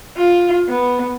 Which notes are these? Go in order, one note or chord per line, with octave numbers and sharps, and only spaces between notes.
F4
B3